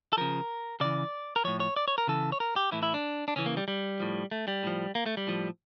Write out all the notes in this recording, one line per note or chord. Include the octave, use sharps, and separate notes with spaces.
A4
C#3 F3 A#4
C#3 E3 D5
A#4
A2 F3 C#5
C#5
D5
C#5
A#4
C#3 E3 A4
C#5
A#4
G4
A2 E3 E4
E4
D4
D4
C#3 E3 C#4
A#3
G3
G3
A2 F3
A3
G3
A2 F3
A#3
A3
G3
A2 F3